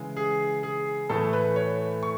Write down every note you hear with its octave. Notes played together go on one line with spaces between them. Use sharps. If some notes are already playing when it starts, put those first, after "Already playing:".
Already playing: C#3 E3 G#3
G#4
G#4
A2 E3 A3 A4
B4
C#5
C#6